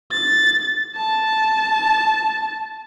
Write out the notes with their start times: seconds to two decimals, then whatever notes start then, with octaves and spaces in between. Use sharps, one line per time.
0.12 A6
0.96 A5